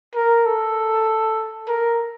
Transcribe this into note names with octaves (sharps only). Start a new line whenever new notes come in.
A#4
A4
A#4